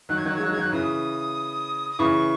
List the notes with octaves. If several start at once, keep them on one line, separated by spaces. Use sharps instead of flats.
D#3 F#3 F#6
G#6
D#3 F#3 F#6
G#3 G#6
D#3 F#3 F#6
G#3
G#6
D#3 F#3 F#6
C#3 E3 D#6
D#6
C#3 E3 C#6